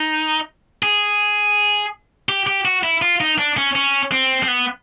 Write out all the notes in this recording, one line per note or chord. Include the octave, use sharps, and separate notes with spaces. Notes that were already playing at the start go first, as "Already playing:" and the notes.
Already playing: D#4
G#4
G4
G4
F#4
E4
F4
D#4
D4
C#4
C#4
C4
C4
B3